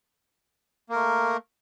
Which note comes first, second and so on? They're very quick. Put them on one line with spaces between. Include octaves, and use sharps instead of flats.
A#3 A#4 A3